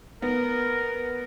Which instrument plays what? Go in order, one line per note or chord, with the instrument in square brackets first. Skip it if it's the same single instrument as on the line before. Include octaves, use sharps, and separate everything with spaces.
[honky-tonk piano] B3 [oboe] A#4